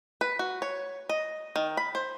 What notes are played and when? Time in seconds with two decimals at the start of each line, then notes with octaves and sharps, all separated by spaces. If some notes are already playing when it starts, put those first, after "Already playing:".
0.21 B4
0.39 F#4
0.62 C#5
1.09 D#5
1.56 D#3
1.77 B5
1.95 C5